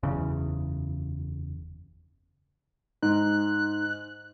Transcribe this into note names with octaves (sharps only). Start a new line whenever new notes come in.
F#1 E2 C#3
G#2 D#4 F#6